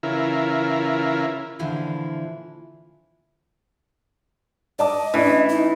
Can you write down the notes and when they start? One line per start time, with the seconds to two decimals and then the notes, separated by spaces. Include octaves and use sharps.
0.03 C#3 E3 E4 F4 A#4
1.59 A#2 D3 E3 F3 E4 F4
4.79 D5 D#5 A5 D6
5.14 A2 E3 C#4 D4
5.49 D#4